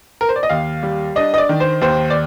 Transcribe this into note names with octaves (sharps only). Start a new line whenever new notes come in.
A#4
C5
D5
D#5
D#2 F5
G3
D4 D#5
D#5
D5
D#3
C5
D#2 C5
D5